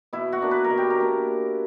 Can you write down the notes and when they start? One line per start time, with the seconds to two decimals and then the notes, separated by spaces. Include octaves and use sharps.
0.13 B2 E4
0.32 F#4
0.42 A#3 D4
0.51 B4
0.64 A#4
0.70 B2
0.78 G4
0.90 A#4
1.00 A#3 D4